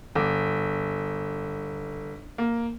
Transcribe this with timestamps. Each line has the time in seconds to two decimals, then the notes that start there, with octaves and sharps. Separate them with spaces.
0.15 G1 D6
2.38 A#3